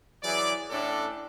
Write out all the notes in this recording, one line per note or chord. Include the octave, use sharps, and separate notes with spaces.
E3 F#3 G#4 D5
A2 C#4 D4 A4 D5